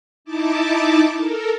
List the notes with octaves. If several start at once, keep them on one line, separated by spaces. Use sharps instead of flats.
D#4 E4 A5 D6
A4 A#4